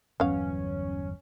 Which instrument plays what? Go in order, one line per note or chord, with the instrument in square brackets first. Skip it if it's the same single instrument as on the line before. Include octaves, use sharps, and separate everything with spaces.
[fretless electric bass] G1 E2 F#3 [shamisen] B3 F5 [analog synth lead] C#4